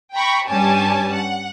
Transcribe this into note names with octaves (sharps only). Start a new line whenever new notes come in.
G5 A#5 B5 C#6
G2 G3 C#4 G4 G#5 A5
F#5